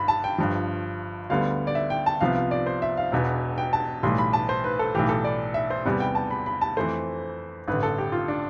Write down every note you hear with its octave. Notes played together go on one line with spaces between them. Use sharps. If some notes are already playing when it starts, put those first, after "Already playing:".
Already playing: G1 G2 B5
A5
G5
G1 G2 F3
D2 D3 G3 B3 F5
D5
E5
G5
A5
C2 C3 F3 B3 F5
F5
D5
C5
E5
F5
E1 E2 B2 B3
G5
A5
B1 A2 E3 G3 C6
B5
A5
C5
B4
A4
B1 A2 E3 G4
A4
D5
E5
C5
E2 C3 G3 B3
G5
A5
B5
B5
A5
F2 E3 A3 C5
A1 G2 D3 B4
A4
G4
F4
D4